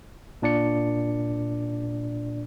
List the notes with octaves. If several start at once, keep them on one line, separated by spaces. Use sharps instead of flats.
A#2 D4 D5 C#7